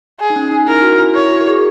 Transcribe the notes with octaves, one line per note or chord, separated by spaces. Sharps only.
G#4
D#4
C#4
D#4
E4 A#4
F#4
E4
E4 C#5
F#4
A#4
G#4